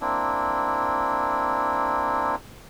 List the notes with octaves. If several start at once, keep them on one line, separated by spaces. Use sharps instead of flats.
A#3 C4 D4 E4